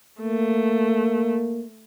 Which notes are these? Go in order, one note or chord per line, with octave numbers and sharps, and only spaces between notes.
A3 A#3